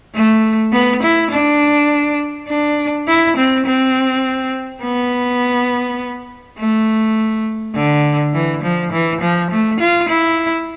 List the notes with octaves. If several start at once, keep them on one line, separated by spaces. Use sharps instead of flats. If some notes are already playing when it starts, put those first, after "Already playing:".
A3
B3
E4
D4
D4
E4
C4
C4
B3
A3
D3
E3
F3
E3
F3
A3
F4
E4